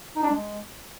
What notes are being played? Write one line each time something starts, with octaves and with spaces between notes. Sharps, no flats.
D#4
D4
G#3